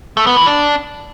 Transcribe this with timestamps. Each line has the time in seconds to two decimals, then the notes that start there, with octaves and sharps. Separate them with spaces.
0.17 A3
0.27 B3
0.36 E3
0.46 D4